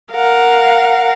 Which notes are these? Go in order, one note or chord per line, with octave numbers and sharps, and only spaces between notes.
A#4 F5 F#5